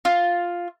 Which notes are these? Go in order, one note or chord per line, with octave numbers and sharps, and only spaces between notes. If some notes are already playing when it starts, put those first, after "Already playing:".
F4